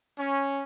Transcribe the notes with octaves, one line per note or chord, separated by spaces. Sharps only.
C#4